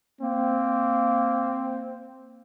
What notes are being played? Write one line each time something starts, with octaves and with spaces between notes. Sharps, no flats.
A#3 C4